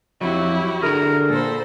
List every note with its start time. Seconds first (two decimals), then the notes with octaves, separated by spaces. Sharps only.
0.21 F2 F#3 E4 F#4 G4
0.82 D3 G#4 A#4 A#5
1.29 A#2 A4 C5 B5